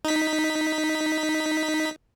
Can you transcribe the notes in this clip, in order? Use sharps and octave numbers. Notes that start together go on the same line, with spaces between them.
D#4 B6